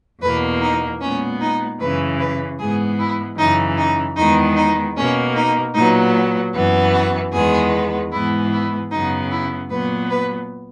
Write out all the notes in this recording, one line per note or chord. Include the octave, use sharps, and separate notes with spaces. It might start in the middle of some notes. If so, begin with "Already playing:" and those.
E2 B2 A#3 B4
D#4
A#2 G#3 B3 C#4
D#4
F#2 C#3 E3 B4
B4
G#2 E3 G#3 B3 G#4
E4
F#2 C#3 E3 D#4
D#4
E2 D#3 G#3 B3 D#4
D#4
B2 A#3 C#4
D#4
A#2 F#3 B3 D#4
F#2 E3 B3
F#4
E2 D#3 G#3 B3 G#4
G#2 E3 G#3 B3 E4
E4
F#2 C#3 F#3 B3 D#4
E4
A#2 F#3 B3 B4
B4